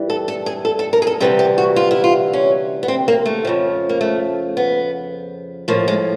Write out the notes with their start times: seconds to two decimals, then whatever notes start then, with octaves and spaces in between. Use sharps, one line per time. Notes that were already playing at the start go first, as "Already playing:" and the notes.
Already playing: G2 E3 G3
0.10 A4
0.28 A4
0.46 G#4
0.65 A4
0.79 A4
0.93 A#4
1.02 G#4
1.07 A4
1.20 D2 C3 E3 G3 G#4
1.39 G4
1.58 F#4
1.76 F4
1.91 E4
2.04 F4
2.33 C#4
2.83 B3
2.88 C4
3.08 A#3
3.26 A3
3.45 F2 C#3 F3
3.89 A#3
4.01 A3
4.57 B3
5.68 A2 F3 A#3
5.88 G#3